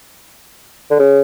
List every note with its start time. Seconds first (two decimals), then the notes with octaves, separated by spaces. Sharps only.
0.91 D3
0.99 C#3